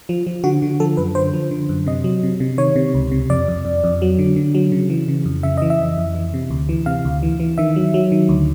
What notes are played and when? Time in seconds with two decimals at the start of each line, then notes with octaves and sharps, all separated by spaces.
0.09 F3
0.27 F3
0.44 D3 F#4
0.62 D3
0.80 F3 A4
0.97 F#2 B4
1.15 D3 C5
1.33 F3
1.51 D3
1.69 F#2
1.86 C3 D#5
2.04 F#3
2.23 C3
2.40 C3
2.58 D#3 C#5
2.76 C3
2.94 C#2
3.11 C3
3.30 F2 D5
3.48 F2
3.65 F2
3.84 F2
4.02 F#3
4.19 D3
4.36 D3
4.55 F#3
4.72 C#3
4.90 E3
5.08 C#3
5.25 F2
5.43 C#3 E5
5.57 E3 D#5
5.70 E5
5.80 F2
5.98 F2
6.15 E3
6.34 C3
6.50 D2
6.69 E3
6.86 C3 F5
7.05 D2
7.23 E3
7.40 E3
7.58 D#3 E5
7.76 F#3
7.94 F#3
8.12 D#3
8.29 D2